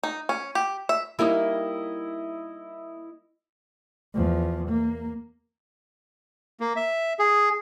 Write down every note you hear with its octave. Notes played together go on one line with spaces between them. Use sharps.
D#4
C#4
G4
E5
G3 A#3 D#4 E4 D#5
E2 F3
A#3
A#3
E5
G#4